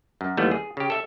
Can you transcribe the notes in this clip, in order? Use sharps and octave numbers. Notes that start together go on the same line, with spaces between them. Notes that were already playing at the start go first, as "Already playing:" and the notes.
F#2
D#2 E3 G3 A3 B3
G#4
C#3 G4
A4 E5